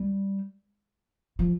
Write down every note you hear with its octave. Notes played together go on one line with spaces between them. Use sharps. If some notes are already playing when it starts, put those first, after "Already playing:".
Already playing: G3
F3